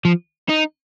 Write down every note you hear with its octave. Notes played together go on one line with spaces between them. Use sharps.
F3
D#4